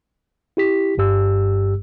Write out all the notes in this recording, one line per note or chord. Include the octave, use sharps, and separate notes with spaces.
E4 G4 B6
G1 G2 G4 E6